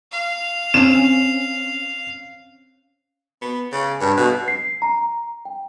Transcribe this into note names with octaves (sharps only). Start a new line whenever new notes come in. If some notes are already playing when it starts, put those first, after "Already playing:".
F5
C4 C#4 E7
B3
C#3
G2
B2
C7
A#5
G5